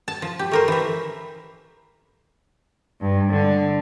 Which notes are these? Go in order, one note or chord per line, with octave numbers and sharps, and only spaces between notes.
A5
F3
G4
A3 A#4 C5
E3 E5
G2
D3